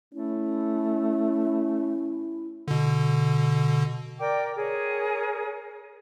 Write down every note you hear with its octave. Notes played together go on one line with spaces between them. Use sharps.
A3 C#4 E4
B2 D3
A#4 D5 G5 D6
G#4 A#4 C#5